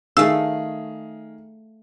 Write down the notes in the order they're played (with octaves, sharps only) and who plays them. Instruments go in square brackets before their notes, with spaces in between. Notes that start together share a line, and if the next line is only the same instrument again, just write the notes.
[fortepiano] D#3 G#4 [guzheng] A3 F5 [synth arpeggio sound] E6